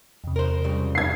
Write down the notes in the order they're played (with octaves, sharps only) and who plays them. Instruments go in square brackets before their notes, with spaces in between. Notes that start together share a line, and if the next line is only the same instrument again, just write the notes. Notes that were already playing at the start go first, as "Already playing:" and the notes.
[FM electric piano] E2 C3
[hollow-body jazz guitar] A#4 C5
C#2 C#3 G3
[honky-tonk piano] G#6 C7